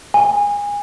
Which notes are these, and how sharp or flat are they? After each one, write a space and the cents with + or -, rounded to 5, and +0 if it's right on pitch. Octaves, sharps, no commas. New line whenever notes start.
G#5 -25